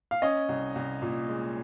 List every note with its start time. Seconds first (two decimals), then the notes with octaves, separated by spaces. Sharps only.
0.11 F5
0.22 C#4 D#5
0.49 C2
0.76 C2
1.02 A#2
1.29 G#3